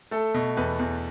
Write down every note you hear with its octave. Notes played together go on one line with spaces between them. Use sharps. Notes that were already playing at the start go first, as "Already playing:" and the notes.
A3 A4
B2
E2 B4
E2